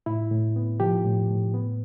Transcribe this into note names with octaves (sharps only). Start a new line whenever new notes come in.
A2 E4
A2
B3
F3 G4
A2
A2
B3